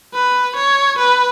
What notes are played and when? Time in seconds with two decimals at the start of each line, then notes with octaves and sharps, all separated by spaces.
0.14 B4
0.56 C#5
0.98 B4